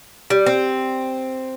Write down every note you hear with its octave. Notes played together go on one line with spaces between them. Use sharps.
G3
C4